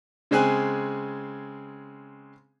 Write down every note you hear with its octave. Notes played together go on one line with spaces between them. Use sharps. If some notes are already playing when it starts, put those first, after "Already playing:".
C#3 G#3 C4 G#4 G#5 F#6